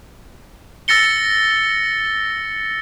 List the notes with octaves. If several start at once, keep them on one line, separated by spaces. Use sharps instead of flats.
E6 A6 A#6 C#7 G7